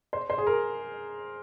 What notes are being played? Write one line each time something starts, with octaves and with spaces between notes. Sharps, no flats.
C5
C5
G#4
A#4